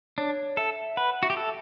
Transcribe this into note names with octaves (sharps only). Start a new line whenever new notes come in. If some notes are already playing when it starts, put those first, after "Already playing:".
D4 C#5
A4 E5
B4 F#5
F#4 E5
G4
A4